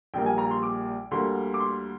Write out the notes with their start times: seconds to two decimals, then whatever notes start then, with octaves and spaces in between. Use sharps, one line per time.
0.14 A#1 A#2 G3 A#3 G5
0.26 G#5
0.38 A#5
0.51 C6
0.63 D6
1.11 D2 D3 G3 A#3 C6
1.54 D6
1.60 C6